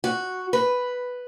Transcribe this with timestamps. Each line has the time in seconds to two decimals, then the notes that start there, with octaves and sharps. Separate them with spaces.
0.04 F#4
0.53 B4